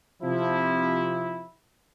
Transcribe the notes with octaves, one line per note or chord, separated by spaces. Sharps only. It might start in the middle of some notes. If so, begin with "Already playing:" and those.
C3 F3 E4